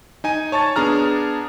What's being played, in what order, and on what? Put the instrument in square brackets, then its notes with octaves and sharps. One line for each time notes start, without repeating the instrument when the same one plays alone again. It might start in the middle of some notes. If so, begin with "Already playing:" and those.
[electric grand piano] D#4 G#5 D#7
C#5 A5 C#6 A6
B3 D4 G#4 A#5 F6